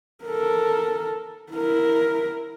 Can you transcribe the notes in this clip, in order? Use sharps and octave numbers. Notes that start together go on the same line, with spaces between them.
A4 A#4
E4 A#4